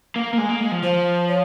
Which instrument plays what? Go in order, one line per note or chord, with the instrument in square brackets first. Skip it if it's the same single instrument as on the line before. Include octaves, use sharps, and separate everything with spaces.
[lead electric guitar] A#3
A#3
G#3
A#3
G#3
F3
[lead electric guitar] F3 [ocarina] C5
[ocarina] C#5